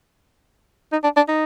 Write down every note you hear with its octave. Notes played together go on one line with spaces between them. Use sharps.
D#4
D4
D4
D#4